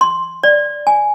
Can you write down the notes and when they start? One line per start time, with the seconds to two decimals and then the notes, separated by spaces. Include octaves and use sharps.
0.01 C6
0.43 D5
0.87 G#5